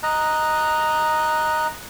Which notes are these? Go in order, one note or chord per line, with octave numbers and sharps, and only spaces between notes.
D#5 A#5 F#6